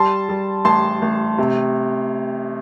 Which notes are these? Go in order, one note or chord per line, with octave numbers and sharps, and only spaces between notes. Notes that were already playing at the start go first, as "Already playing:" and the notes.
Already playing: G3 A5 C6
G3
A1 A5 C6
A1
C3